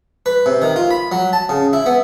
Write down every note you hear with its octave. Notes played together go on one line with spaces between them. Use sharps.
B4
C3
D#3
F4
B5
F#3
A5
C#3
E4
B3